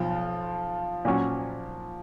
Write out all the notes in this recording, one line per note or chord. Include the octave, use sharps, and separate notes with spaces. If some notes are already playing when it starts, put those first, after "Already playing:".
Already playing: B1 F3 F4
A#2 F#3 C#4